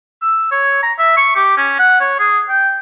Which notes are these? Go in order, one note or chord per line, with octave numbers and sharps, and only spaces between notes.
E6
C#5
A#5
E5
C#6
G4
C#4
F#5
C#5
G#4
G5